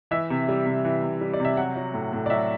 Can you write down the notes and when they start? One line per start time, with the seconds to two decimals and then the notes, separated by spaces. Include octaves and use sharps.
0.11 E3 E5
0.30 C3
0.49 G3
0.66 C3
0.85 E3
1.03 C3
1.21 G3
1.33 D5
1.40 C3 E5
1.57 F#3 F#5
1.76 F#3
1.94 A2
2.13 A2
2.26 D5
2.30 F#3 E5